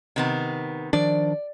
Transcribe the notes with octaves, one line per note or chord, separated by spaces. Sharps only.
C3 D#3 B3
D#3 F3 D4 D5